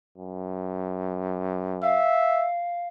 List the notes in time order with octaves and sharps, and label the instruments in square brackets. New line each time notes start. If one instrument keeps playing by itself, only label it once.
[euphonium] F#2
[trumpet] E5 [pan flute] F5